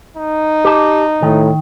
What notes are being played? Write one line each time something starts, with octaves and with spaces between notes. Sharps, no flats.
D#4
G4 A5
A2 D#3